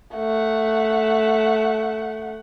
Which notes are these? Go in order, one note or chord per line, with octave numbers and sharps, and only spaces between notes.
A3 F#5